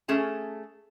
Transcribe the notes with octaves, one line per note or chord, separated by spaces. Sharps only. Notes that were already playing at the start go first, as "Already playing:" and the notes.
A3 C#4 G#4 A5